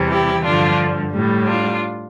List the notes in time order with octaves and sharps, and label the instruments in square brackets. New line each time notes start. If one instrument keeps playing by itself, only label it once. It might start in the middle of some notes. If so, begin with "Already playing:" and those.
Already playing: [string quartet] E2 C3 E3 G3
E4 G4
G2 D3 F3 D4 F4
A2 G3
D4 F4